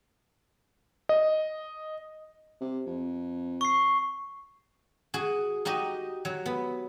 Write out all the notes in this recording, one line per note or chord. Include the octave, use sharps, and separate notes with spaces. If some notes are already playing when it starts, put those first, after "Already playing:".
D#5
C3
F2
C#6 C7
F#4 G#4
D#4 F#4 G4 D#5
F#3
B3